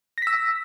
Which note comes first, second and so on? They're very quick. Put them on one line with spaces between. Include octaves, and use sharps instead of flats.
A#6 B6 E6